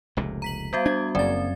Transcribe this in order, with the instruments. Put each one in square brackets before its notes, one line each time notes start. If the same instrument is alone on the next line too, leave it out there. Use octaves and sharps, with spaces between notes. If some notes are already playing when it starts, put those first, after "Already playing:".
[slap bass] F1 C#2 A#2
[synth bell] A#5 B6 F#7
[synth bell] G3 B3 F#4 [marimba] C5 F5
[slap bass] D4 [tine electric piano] G#6
[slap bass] F#1 A#3 [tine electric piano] F#2 [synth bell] C4 A6 [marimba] D5